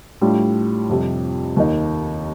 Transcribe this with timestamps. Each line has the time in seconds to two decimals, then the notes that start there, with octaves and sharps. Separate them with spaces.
0.21 A2 G3 D4 F4
0.89 F2 C3 G3
1.56 D#2 D#3 A#3 D#4